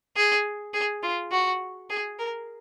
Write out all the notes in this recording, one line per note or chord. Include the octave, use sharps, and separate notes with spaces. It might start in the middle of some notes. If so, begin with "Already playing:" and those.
G#4
G#4
F4
F#4
G#4
A#4